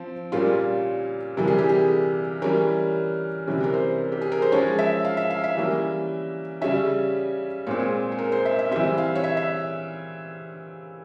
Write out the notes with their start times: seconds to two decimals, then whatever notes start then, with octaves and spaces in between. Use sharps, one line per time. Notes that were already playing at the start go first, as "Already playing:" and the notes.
Already playing: F3 C4
0.32 A#2 G3 A#3 C#4 F4
1.37 C3 E3 G3 A#4
1.47 G#4
1.58 G4
1.69 G#4
2.42 E3 G3 C#4 A#4
3.47 C3 E3 G3 C#4
3.64 A#4
3.74 C5
4.12 G4
4.21 G#4
4.32 A#4
4.42 C5
4.52 F3 G#3 C#4 C#5
4.79 E5
5.05 F5
5.17 E5
5.30 F5
5.44 E5
5.57 E3 G3 A#3 C#4
6.61 C#3 G3 C#4 E5
7.67 A#2 G#3 C4 C#5
8.12 G#4
8.19 A#4
8.32 C5
8.45 E5
8.59 E5
8.71 E3 G3 C4 E5
8.98 F5
9.15 C#5
9.24 E5
9.37 E5